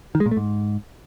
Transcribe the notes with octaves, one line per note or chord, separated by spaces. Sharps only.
D#3
G#3
A#2
A3
G#2